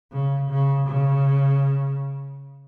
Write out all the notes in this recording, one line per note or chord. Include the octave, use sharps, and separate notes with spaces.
C#3
C#3
C#3